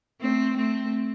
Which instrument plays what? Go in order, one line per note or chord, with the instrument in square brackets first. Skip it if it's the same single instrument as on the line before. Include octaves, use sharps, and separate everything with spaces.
[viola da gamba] A3 C4
A3 C4